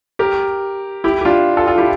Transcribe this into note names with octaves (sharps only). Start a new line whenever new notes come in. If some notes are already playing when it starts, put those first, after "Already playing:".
G4 A#4
E4 G4
G4
D4 F4
F4 A4
F4 A4
E4 G4